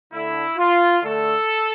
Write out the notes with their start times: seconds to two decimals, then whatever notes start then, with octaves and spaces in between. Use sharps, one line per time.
0.13 D3 A3 E4
0.58 F4
1.03 D3 A3 A4